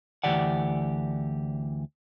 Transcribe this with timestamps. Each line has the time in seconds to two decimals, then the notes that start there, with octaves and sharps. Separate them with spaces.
0.24 D2 B2 E3 G4 D5 F#5